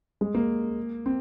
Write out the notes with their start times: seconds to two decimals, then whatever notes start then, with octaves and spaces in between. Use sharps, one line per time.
0.21 G#3
0.35 A#3
1.06 C4